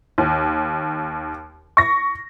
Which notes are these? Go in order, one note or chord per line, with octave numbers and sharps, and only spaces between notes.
D#2
C#6 A#6